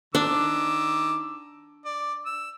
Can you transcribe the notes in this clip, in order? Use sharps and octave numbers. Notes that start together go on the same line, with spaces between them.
D#3 D4 D6 E6
D5
E6